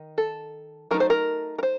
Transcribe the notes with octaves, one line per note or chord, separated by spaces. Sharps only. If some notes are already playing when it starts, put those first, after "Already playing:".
Already playing: D#3 D#4
A4
F#3 A3 D#4 A#4
C5
A#4
A#4
C5